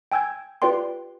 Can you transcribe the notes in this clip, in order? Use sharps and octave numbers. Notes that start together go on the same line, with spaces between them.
G5 G#5 E6 G6 G#6
F4 G4 B4 D5 G5 C6